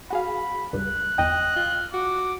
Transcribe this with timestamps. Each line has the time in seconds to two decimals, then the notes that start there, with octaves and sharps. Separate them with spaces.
0.10 F#4 G#4 F5 B5
0.73 C#2 G2 F#6
1.18 G1 E2 D#5 G5
1.56 F4
1.93 F#4 D6